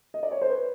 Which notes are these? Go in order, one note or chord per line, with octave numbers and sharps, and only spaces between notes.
D#5
D5
C#5
C5
B4